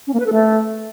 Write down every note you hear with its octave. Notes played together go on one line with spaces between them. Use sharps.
C#4
A#3
B4
A4
A3